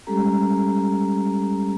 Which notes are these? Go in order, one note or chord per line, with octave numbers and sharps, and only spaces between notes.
G3 G#3 C#4 G4 A4 A#5